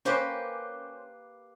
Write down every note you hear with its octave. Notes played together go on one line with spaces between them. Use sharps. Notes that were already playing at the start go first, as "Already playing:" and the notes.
A#3 C#4 G4 B4 C5